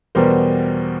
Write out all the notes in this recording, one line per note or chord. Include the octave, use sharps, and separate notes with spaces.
E2 B2 G3 A#4 C5